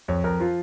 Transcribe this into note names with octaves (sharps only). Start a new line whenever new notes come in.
F2 C#5
F2 A#4
F3 F4